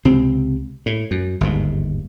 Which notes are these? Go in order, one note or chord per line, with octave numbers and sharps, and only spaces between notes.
C#2 C3 C4
A2
F#2
G1 D#2 G#2